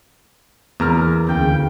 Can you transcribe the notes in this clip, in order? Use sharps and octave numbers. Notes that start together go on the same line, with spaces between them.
E2 A#3 A#5 F6
D2 C#3 G5